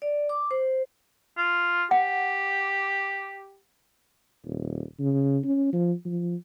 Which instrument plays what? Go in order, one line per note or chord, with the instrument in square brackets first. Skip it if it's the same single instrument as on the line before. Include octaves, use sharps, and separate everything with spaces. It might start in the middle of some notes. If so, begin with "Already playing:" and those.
[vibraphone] D5
D6
C5
[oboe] F4
[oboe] G4 [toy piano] F#5
[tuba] D#1
C#3
C#4
F3
F3